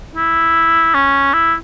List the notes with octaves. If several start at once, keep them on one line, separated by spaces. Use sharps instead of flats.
E4
C#4
E4